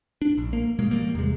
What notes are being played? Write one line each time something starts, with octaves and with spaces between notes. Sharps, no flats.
D4
A#1
A#3
B2 G#3 A#3
A1 G3 A#3
E2 C3 G#3